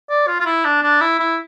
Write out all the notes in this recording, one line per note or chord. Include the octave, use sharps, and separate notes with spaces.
D5
F4
F4
E4
D4
D4
E4
E4